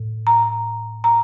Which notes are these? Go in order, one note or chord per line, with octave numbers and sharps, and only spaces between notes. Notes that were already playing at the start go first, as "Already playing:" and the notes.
Already playing: A2
A#5
A#5